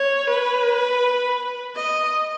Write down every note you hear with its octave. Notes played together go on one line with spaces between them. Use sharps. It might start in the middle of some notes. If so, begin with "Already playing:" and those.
Already playing: C#5
B4
D#5